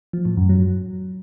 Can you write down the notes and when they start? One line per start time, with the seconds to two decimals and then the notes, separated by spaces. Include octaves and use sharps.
0.13 F3
0.25 A2
0.37 F#2
0.49 F#3